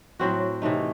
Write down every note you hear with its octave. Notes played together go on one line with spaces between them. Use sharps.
A2 F#3 C4 F#4
C3 E3 A3 D#4